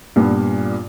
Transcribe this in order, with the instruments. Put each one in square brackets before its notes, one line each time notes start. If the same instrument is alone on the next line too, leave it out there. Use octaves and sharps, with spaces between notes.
[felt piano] G2 A#2 B3